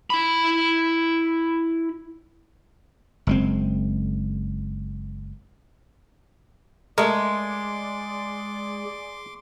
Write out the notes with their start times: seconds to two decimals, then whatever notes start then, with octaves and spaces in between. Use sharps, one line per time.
0.10 E4 B5
3.27 F#1 G#3 C4
6.98 G#3 A3 G#4 A#4 D5 C6 D6